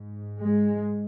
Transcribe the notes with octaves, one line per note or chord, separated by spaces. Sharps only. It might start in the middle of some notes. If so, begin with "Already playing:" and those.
Already playing: G#2
G#3